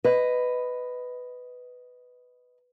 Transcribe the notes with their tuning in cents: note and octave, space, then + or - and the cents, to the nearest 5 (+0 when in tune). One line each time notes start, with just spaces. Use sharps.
B4 +10 D#5 +0